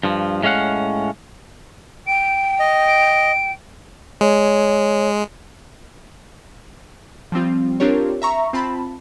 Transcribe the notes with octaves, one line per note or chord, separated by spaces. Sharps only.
G2 F3
A2 G#3 C#4 F5 F#5
G5 D7
D#5
D7
G#3 C#5
F3 G3 C4 F4
C4 D4 F4 G4 A#4 C#5
E5 A#5 C#6
C4 F4 A5 B5